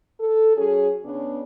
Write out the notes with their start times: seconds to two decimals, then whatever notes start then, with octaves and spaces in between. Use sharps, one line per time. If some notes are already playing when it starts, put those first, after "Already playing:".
0.20 A4
0.56 F#3 C#4 F#4 G#4
1.04 C#3 B3 D4